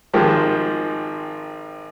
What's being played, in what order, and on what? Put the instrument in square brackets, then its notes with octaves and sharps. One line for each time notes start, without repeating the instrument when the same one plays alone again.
[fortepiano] G#1 D#3 F3 G#3 G4